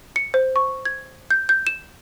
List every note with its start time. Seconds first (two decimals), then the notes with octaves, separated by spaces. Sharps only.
0.16 C#7
0.34 C5
0.56 C#6
0.85 G#6
1.31 G6
1.49 G6
1.67 E7